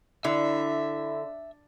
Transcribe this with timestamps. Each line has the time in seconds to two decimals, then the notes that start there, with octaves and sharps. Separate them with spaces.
0.24 D3 E4 E5